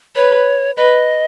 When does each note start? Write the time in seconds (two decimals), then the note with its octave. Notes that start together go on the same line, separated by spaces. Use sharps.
0.16 B4 C#5
0.77 B4 D#5